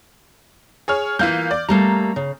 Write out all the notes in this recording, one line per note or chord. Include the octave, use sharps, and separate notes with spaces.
G#4 C#5 F6
E3 A#3 F4 F5 G6
D5
G3 A3 A#3 A#5
C#3